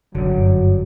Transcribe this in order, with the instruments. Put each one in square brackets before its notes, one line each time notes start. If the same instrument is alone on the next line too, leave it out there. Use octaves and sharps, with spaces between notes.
[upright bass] F#1 [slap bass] G2 D3 [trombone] F#3